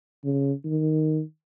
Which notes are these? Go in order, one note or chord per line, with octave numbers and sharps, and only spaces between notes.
C#3
D#3